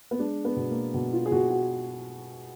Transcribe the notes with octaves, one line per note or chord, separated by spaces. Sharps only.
B3
G#3 D4
B3
B2
A#3
B2
F4
G#4
B2 F#4
F#4